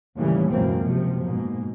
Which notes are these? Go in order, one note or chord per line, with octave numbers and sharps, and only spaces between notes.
D#2 A2 C#3 E3 G3
C#2 F#2 B2 E3 A#3 C4
F#1 C3 F3
G#2 B2 A#3